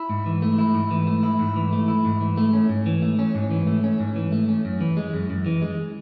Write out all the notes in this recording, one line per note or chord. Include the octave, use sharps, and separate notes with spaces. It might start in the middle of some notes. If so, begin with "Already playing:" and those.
Already playing: E4
G#2
E3
A3
E4
G#2
E3
A3
E4
G#2
E3
A3
E4
G#2
E3
A3
C#4
G#2
E3
A3
C#4
G#2
E3
A3
C#4
G#2
E3
A3
C#4
F#2
E3
G#3
F#2
F#2
E3
G#3